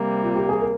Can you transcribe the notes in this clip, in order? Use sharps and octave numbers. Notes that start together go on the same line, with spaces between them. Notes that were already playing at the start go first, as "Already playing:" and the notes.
Already playing: C3 G3 A#3
F4
G4
G#4
A#4